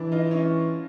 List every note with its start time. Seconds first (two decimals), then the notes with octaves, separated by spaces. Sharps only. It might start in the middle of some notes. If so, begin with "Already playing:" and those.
Already playing: E3 D4 E4
0.12 D#4 F4
0.30 C#4 D#4